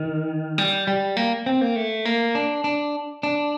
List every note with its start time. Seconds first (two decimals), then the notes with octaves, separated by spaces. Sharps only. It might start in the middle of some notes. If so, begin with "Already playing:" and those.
Already playing: D#3
0.58 G3
0.87 G3
1.17 A#3
1.46 C4
1.61 A#3
1.76 A3
2.05 A#3
2.35 D4
2.64 D4
3.23 D4